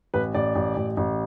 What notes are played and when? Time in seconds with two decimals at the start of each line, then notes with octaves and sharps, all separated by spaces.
0.14 A1 B4
0.34 A1 D5
0.56 A1
0.77 A1
0.97 A1